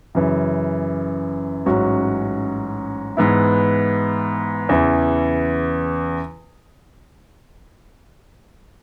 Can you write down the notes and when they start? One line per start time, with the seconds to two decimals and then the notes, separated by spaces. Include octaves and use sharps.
0.15 F#2 C#3 E3
1.66 A1 G#2 F#3 C#4 F#4
3.17 G#2 E3 B3 E4
4.69 E2 C#3 E3